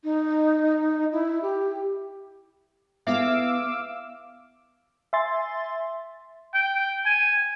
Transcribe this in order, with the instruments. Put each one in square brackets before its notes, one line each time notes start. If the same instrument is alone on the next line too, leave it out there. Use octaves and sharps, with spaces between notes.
[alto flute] D#4
E4
G4
[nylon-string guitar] B3 E4 G#4 [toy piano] E5 [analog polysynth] F5 D6 E6
[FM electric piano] E5 G#5 C6 A6
[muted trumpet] G5
G#5